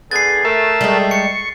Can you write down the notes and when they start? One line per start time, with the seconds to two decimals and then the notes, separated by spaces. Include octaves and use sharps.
0.11 D3 B3 G#4 A6 C7
0.45 A3 A#4 E5 A5
0.81 G3 G#3
1.11 C#6 C#7